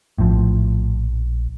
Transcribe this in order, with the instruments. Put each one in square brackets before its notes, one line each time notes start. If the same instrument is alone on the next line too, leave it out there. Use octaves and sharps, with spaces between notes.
[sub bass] A#1 [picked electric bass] A2 F3